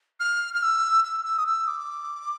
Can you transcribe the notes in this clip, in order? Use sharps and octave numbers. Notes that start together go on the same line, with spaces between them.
F6
F6
E6
E6
E6
D#6
E6
D6